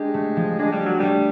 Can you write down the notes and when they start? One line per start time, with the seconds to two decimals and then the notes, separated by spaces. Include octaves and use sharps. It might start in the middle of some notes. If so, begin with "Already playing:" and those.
Already playing: G#3 D4 G4
0.14 A3
0.36 F3
0.59 G#3 D4
0.72 G3
0.80 G4
0.85 F#3
0.99 G3 A3